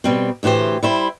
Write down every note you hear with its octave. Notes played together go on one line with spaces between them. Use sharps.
B2 G3 C4
D2 A2 E3 G4 C5
G3 E4 C5